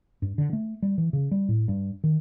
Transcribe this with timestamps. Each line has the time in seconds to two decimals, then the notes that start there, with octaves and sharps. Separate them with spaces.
0.22 G2
0.38 D3
0.53 A3
0.82 G3
0.98 E3
1.13 C#3
1.31 G3
1.49 A2
1.68 G2
2.04 D#3